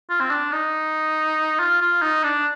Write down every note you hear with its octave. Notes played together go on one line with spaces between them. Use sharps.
F4
C4
D4
D#4
F4
F4
D#4
D4